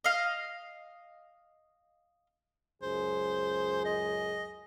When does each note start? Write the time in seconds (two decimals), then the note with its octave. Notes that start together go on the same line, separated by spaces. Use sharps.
0.04 D#5 F5
2.82 C#2 F#2 G#4 C5
3.85 D#5